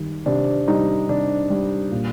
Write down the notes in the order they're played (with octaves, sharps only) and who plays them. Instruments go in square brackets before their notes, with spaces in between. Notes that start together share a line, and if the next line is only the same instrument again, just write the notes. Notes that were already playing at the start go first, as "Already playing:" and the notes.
Already playing: [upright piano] D#3 G3
C3 D4
G3 D#4
C3 D4
G3
A#2